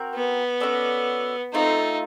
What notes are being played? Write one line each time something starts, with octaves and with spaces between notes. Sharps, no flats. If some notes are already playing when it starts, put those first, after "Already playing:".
Already playing: C4 F#4 A#4
B3
C#4 F#4 A4 D5
A3 C4 D#4 F4